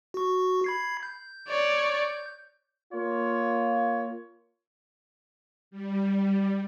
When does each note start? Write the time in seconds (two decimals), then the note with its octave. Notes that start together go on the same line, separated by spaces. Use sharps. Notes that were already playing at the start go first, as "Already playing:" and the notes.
0.14 F#4 C#6
0.64 B5 G#6 C7
1.03 G6
1.48 C#5 D5
2.93 A#3 F4 C#5
5.71 G3